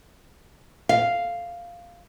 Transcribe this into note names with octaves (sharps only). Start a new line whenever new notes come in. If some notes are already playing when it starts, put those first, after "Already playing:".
F5